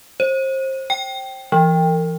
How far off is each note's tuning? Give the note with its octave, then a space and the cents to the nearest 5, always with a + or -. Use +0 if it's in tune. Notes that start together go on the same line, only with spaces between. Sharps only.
C5 +30
G5 -10
E3 +30